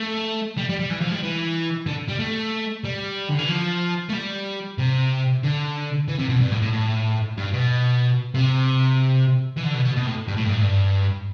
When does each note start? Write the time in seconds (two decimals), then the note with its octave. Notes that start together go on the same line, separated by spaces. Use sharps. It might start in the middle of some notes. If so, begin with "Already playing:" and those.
Already playing: A3
0.57 G3
0.69 G3
0.80 G3
0.90 E3
1.01 F3
1.12 G3
1.23 E3
1.87 D3
2.09 G3
2.20 A3
2.85 G3
3.29 D3
3.39 E3
3.49 F3
4.09 A3
4.13 G3
4.78 C3
5.43 D3
6.08 E3
6.19 C3
6.29 B2
6.41 G2
6.52 A2
6.62 A2
6.73 A2
7.37 G2
7.53 B2
8.34 C3
9.57 E3
9.64 D3
9.74 B2
9.85 B2
9.97 B2
10.07 A2
10.28 G2
10.37 A2
10.45 G2
10.52 A2
10.61 G2